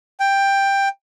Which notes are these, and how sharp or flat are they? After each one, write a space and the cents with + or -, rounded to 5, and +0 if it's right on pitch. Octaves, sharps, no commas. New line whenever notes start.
G5 +10